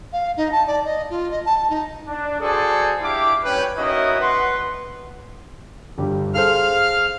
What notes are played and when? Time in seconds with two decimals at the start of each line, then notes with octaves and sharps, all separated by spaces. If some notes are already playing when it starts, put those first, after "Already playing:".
0.13 F5
0.37 D#4
0.52 A5
0.67 D5
0.85 D#5
1.10 F4
1.31 D#5
1.45 A5
1.70 D#4
2.07 D4
2.41 F#4 G#4 A4 C5 D5 G#5
3.01 D4 E4 G4 F5 D6
3.44 G3 C#4 B4 C#5 G5
3.76 A#3 C#4 D#4 E4 F#4 D#5
4.19 B4 F#5 C6
5.98 G1 G3 G4
6.35 G#4 A4 C5 F5 F6